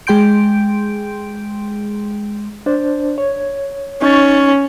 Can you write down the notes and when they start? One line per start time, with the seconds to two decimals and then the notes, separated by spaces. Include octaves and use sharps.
0.07 G#3 G#4 G5 C6 G6 D7
2.66 D4 C5 D5
3.18 C#5
4.02 C#4 D#4 C#6 A6